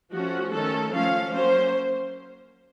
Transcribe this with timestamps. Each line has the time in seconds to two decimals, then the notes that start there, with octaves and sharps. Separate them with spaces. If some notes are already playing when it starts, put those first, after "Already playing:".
0.12 F3 A3 C#4 F#4
0.53 D#3 A3 C#4 A4
0.93 F3 A3 C#4 F5
1.32 F#3 A#3 C#4 C5